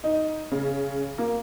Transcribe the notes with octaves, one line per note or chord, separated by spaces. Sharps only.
D#4
C#3
A#3